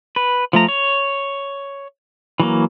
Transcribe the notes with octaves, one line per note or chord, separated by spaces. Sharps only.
B4
F3 A3 A#5
C#5
E3 F#3 A#3